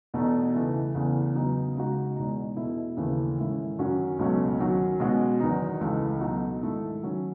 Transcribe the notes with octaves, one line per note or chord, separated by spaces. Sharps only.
E2 B2 A3 D#4 F#4
C#3 E3 A3 E4
E2 C#3 E3 A3
C#3 F#3 B3 D#4
C#3 G#3 D#4 F#4
E2 B2 G#3 D#4
B2 A3 E4
D#2 C#3 E3 A3 C#4
G#2 D#3 A3 C#4 E4
F#2 D#3 F#3 C#4 F#4
C#2 B2 F#3 A3 C#4
D#3 F#3 C#4 F#4
B2 G#3 C#4 F#4
E2 D#3 F#3 B3 D#4
C#2 C#3 E3 A3
B2 F#3 A3 D#4 F#4
G#2 D#3 A3 E4
D#3 F#3 C#4